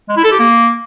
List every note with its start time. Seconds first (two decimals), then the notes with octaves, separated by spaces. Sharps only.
0.09 G#3
0.17 E4
0.24 A4
0.32 G4
0.40 A#3